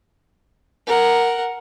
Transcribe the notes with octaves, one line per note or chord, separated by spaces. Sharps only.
A#4 F#5